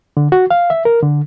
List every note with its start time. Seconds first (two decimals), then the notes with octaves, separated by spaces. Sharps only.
0.17 D3
0.32 F#4
0.51 F5
0.70 E5
0.85 A#4
1.03 D3